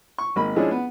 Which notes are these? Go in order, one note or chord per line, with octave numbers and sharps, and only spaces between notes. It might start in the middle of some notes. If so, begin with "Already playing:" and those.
C#6
G#1 A#3 B5
F3 G#3 C#4 D4 E4 G#4
B3